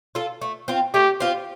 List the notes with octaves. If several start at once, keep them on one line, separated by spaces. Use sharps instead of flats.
F4 A4
A3
C4 F4
A3 G4
C4 F4